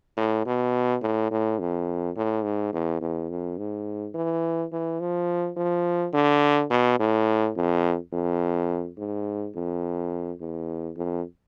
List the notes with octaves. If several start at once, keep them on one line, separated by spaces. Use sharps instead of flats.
A2
B2
A2
A2
F2
A2
G#2
E2
E2
F2
G#2
E3
E3
F3
F3
D3
B2
A2
F2
F2
G#2
F2
E2
F2